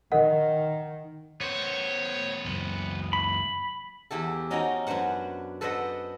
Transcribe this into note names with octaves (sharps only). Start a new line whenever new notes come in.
D#3 A#4 D#5 F#5
B3 C5 C#5
C#2 F#2
B5
E2 E4 G4 A4
C#4 D#4 F#4 C5 D#5 G5
F#2 D4 B4 C5 F#5
A4 B4 C5 D5 D#5 F#5